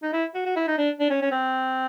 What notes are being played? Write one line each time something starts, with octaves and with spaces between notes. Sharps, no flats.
D#4
E4
F#4
F#4
E4
D#4
D4
D4
C#4
C#4
C4